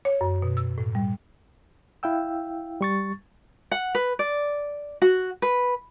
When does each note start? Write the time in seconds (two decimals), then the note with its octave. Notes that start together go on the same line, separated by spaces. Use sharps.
0.05 C#5
0.21 F#2
0.42 B2
0.57 E6
0.78 A2
0.95 G3
2.03 E4 F5 G5 E6
2.81 G3 C#6 A6
3.71 F#5
3.95 B4
4.19 D5
5.02 F#4
5.42 B4